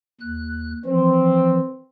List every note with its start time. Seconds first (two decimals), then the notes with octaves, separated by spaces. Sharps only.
0.21 D#2 F#6
0.85 E3 F3 C4